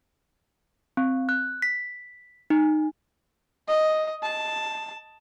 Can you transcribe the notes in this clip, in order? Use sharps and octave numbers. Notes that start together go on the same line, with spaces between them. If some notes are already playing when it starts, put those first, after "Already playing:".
C4
F#6
B6
D#4
D#5
A5